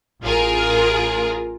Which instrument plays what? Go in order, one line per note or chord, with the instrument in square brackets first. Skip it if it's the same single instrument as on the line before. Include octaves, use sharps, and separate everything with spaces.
[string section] A1 F4 G#4 A#4